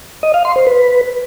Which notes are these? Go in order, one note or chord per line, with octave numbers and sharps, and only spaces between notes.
D#5
F5
C6
C5
B4